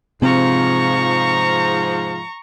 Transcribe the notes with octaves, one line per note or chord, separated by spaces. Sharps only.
G#2 C3 F3 C4 A#5 C#6